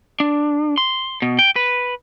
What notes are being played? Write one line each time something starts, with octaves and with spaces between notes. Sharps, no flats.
D4
C6
B2
G5
B4